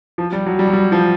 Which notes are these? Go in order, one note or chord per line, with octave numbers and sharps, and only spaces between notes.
F3
G3
F#3
G3
F#3
G3
F3